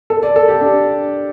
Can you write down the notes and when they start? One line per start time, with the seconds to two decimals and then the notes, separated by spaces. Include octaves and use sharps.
0.10 A4
0.23 D5
0.36 A4
0.48 G4
0.61 D4